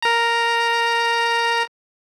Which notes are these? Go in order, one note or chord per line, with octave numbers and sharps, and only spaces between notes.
A#4 A#5